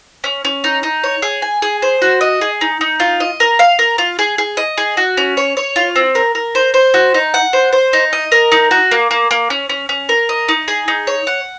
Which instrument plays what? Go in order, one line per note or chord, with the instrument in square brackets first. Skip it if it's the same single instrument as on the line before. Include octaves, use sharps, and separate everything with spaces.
[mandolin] C#4
C#4
D#4
D#4
C#5
G#4
G#5
G#4
C5
F#4
D#5
G#4
D#4
D#4
F4
D#5
A#4
F5
A#4
F4
G#4
G#4
D#5
G#4
F#4
C#4
C#5
C#5
F4
C4
A#4
A#4
C5
C5
F#4
D#4
F#5
C5
C5
D#4
D#5
A#4
D#4
F#4
A#3
A#3
A#3
C#4
C#4
C#4
A#4
D#5
D#4
G#4
D#4
C#5
F#5